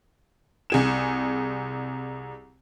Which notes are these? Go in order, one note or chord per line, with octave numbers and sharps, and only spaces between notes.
C2 G#4 E7